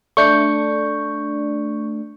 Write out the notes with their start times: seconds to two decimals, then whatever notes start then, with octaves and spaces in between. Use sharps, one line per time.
0.17 A3 D4 C#6 G6 C#7